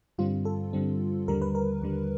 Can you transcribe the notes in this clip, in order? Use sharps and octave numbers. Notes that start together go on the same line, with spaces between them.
G2 D3 G3 C4 F4
A4
G2 D3 G3 C4
D#2 D3 G3 A#4
B4
A#4
D#2 D3 G3